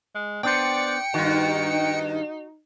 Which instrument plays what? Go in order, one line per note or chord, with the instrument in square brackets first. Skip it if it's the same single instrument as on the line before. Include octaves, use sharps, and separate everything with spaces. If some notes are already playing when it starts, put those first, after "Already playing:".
[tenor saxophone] G#3
[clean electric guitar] B3 D4 C5 [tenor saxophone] D5 [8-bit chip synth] G5 C#7
[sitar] G2 D#3 [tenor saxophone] D#4 [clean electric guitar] F#4